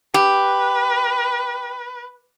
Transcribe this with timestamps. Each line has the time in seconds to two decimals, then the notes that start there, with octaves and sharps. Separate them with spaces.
0.14 G4 B4